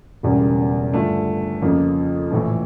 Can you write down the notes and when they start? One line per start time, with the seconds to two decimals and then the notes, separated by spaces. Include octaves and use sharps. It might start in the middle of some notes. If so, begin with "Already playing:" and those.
0.23 E1 E2 C#3 G3
0.92 G2 D3 A3 D4 F4
1.62 F2 C#3 F3 A#3
2.31 A#1 A2 E3